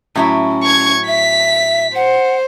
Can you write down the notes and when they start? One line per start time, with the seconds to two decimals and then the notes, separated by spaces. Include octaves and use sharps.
0.16 A2 F#3 C#4 E4
0.64 C#6 G#6
1.08 E5 B6
1.95 C5 F#5